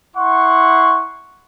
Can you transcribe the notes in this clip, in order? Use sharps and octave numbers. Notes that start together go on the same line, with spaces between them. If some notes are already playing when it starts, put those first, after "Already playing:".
E4 F#5 C6 C#6